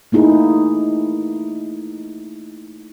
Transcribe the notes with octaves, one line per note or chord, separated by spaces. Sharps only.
A3 A#3 D#4 E4 G#4